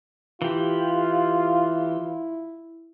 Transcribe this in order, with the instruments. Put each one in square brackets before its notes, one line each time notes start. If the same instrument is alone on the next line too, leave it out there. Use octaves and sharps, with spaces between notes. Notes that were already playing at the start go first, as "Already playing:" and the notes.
[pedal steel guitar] E3 G4 [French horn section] E4 [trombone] F4